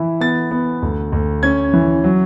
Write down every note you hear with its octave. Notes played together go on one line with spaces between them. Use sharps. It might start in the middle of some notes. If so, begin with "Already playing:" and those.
Already playing: E3 E4
B3 A6
B3
D2
D2
C#4 G#6
E3
F#3